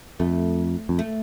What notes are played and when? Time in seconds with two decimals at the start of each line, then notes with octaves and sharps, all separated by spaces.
0.20 F2 A3
0.89 F2
0.99 A3